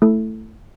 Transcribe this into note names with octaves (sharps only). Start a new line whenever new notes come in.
A3 E4 A4